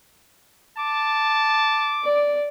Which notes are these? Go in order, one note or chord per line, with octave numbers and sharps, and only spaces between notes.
A5 D6
D5